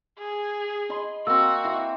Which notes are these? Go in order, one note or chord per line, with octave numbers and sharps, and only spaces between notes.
G#4
D#5 B5 C6
A#3 C4 F#4 E6
E3